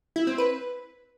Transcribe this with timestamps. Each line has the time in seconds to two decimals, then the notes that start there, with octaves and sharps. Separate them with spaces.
0.16 E4
0.27 C4
0.38 B4